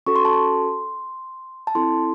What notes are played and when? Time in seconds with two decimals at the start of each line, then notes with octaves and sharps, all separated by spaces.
0.07 C#4 F#4 A4 C#6
0.16 C6
0.25 A5
0.33 C6
1.67 A5
1.75 C4 E4 A4 C6